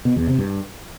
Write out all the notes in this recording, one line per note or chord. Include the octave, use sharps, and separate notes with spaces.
B2
E2
C3
G2